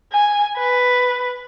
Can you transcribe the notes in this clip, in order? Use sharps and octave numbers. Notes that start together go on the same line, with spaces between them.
G#5
B4